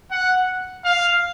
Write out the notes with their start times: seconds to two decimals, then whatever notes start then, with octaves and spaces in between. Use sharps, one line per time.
0.11 F#5
0.85 F5